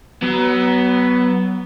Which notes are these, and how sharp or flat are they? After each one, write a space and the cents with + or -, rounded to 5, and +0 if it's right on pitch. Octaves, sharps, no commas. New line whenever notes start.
F#3 +30 B3 +0